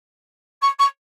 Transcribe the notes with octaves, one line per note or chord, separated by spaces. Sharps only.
C#6
C#6